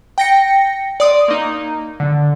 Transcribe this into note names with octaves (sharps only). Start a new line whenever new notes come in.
G5 A#6 C#7
D5 C6 D#6
A#3 D#4
D3